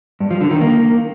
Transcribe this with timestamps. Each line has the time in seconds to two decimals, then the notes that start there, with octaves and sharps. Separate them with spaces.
0.20 G2
0.31 F3
0.41 D3
0.51 D#3
0.61 A#3